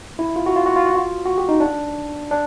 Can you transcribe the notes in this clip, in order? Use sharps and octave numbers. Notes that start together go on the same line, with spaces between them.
E4
F4
F#4
F4
F#4
F4
F#4
F4
F#4
G4
D#4
D4
D4